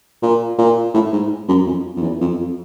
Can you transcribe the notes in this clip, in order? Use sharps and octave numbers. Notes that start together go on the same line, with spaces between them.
A#2
A#2
A2
G#2
F#2
F2
F2
E2
F2
F2